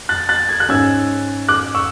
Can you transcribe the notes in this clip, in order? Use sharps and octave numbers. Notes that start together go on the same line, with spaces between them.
F#6 A6
F#6 A6
G#6
F#6
G#2 G#3 C#4 E6 G#6
D6 F#6
C#6 E6